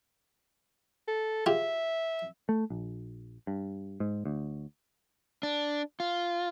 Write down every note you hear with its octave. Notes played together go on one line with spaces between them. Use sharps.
A4
F4 G4 G#4 E5
A3
A#1
G2
G#2
D2
D4
F4